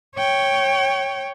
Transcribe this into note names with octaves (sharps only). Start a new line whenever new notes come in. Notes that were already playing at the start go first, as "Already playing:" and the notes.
C#5 G5